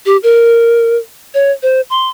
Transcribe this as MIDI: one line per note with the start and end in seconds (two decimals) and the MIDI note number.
0.06 0.17 67
0.23 0.97 70
1.34 1.52 73
1.63 1.81 72
1.90 2.09 84